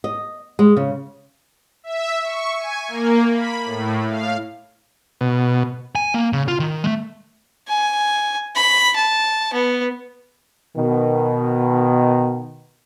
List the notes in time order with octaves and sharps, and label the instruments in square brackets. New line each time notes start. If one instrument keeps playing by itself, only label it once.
[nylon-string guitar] D#5
G#3
C#3
[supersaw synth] E5
C#6
G#5
A#3
B5
A2
F5
[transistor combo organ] B2
[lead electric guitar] G#5
A#3
C#3
F4
D#3
G#3 A3
[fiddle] G#5
B5
A5
B3
[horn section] B2 D#3